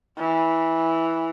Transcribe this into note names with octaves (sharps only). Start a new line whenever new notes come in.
E3